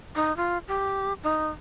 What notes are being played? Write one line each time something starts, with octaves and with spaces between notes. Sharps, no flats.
D#4
F4
G4
D#4